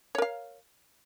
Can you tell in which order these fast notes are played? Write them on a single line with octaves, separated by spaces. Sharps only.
C#5 A#4 F5